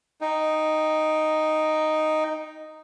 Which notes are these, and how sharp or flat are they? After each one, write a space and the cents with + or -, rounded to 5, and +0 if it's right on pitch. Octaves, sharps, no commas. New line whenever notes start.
D#4 +0 G5 +0